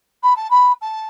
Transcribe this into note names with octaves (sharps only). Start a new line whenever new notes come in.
B5
A5
B5
A5